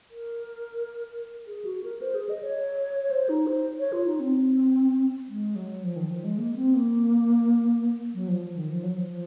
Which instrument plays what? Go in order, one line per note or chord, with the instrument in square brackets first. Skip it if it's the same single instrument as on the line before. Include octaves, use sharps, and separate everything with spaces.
[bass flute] A#4
G#4
F#4
A#4
C5
G#4
D#5
C#5
C#5
C5
D#4
C5
C#5
F4
D#4
C4
G#3
F#3
F3
D#3
F3
G#3
A#3
C4
A#3
F#3
F3
F3
D#3
F3
F#3
F3
F3